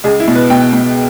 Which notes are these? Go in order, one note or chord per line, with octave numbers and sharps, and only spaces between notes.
C#2 G#4
E4
B2
B4
B2 G5
B2